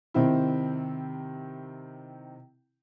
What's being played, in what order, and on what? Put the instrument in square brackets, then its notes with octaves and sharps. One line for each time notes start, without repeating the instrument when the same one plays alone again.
[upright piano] C3 D#3 C4 E4